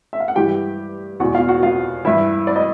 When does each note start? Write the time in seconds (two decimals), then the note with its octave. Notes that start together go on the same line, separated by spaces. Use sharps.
0.13 E5
0.20 F5
0.28 F#5
0.36 G2 E3 G4 G5
1.20 E2 F#4 F#5
1.24 B2
1.35 F4 F5
1.49 F#4 F#5
1.63 F4 F5
2.05 G2 E3 E4 E5
2.47 D5
2.56 D#5